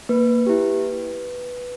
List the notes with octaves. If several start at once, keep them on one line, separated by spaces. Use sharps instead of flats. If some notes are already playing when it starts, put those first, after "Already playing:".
A#3 B4
E4 G4